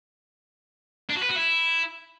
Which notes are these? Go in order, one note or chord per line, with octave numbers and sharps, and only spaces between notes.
D4
F#4
B4
F#4
E4